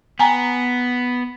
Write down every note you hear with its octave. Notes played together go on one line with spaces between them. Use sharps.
B3 G5 G#5 A#5